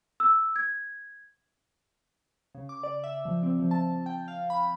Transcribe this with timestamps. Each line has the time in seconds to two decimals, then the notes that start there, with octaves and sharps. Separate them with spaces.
0.20 E6
0.56 G#6
2.55 C#3
2.69 D6
2.83 D5
3.04 E5
3.25 F3
3.43 C4
3.59 F3
3.71 A5
4.06 G5
4.28 F5
4.50 B5